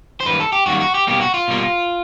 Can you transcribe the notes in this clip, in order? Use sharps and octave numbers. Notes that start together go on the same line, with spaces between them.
C5
F#2 D#3 G3 A#3 B4
A4
G4
F#2 D#3 G3 A#3 F#4
F#4
G4
B2 G3 A#3 G4
F#4
F4
B2 G3 A#3